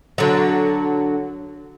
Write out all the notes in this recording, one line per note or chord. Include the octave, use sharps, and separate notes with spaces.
D3 F#3